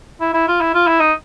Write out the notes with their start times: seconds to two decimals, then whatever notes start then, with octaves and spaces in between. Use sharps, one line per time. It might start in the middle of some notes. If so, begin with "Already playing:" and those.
0.21 E4
0.34 E4
0.48 F4
0.61 E4
0.74 F4
0.87 E4
1.00 D#4